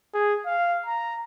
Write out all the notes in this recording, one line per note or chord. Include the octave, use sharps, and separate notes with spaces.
G#4
F5
A#5